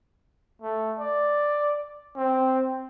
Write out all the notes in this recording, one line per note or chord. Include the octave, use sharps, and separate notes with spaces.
A3
D5
C4